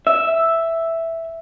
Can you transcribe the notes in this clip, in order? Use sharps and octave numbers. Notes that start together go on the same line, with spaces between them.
E5